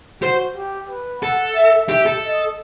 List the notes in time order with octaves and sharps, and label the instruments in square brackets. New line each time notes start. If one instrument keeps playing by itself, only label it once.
[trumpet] F#4 [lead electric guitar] C5
[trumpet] G4
B4
[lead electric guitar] A4 [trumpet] F#5
[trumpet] E5
[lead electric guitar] G4 [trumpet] E5
[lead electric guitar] A4
[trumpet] D#5